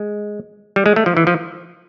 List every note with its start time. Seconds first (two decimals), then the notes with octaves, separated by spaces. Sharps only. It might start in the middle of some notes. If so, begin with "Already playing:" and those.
Already playing: G#3
0.76 G3
0.86 G#3
0.96 A3
1.06 F3
1.17 E3
1.27 F3